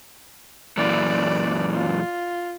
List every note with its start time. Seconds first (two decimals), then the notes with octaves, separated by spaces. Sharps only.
0.77 F#2 A#2 E3 D5
1.73 F4